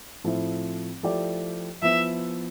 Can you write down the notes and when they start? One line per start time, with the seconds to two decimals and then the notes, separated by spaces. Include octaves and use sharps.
0.24 A2 F3 C4 E4
1.03 F3 A3 E4 G4 D5
1.82 F3 B3 E4 E5